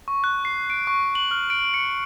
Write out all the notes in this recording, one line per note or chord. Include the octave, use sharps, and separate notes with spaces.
C#6
F#6
C7
D7
C#6
F#7
F6
D7
C#7